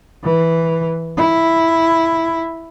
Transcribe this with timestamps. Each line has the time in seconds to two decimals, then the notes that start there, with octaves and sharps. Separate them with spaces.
0.24 E3
1.17 E4